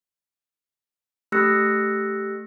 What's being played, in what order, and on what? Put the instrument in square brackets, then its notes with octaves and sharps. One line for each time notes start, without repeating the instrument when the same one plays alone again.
[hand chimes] A3 G4 E6 F#6 A#6 C#7